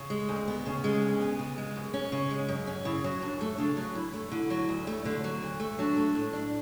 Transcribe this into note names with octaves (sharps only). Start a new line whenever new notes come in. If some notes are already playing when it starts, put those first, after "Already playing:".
Already playing: C#3
G#3
D2 C#4
B3
C#3 C#4
G#3
D2
B3
C#3
G#3
F#2
C#4
C#3
G#3
F#2
C#4
C#3 E4
F#3
F#2 D4
A3
C#3 D4
F#3
F#2 E4
A3
D3 E4
F#3
D2
A3
D3
F#3
D2
A3
F#3 D4
A3
A2
D4